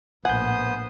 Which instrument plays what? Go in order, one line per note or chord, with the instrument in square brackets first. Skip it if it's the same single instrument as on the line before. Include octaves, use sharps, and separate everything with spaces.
[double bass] A#1 A2 [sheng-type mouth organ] B3 C5 D#6 [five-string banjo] F#5 [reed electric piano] G#5 G6